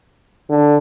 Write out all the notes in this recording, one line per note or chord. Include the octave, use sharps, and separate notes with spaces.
D3